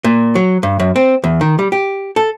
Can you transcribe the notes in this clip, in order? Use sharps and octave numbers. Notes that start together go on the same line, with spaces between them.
A#2
F#3
G2
F#2
C4
E2
D#3
G3
G4
A4